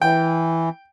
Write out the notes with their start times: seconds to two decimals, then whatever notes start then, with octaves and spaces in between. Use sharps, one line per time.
0.02 E3 G5